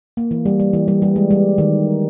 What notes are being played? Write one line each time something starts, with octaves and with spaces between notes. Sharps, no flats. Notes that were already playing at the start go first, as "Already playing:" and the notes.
A#3
E3
G3
G3
E3
G3
G3
G#3
G3
D#3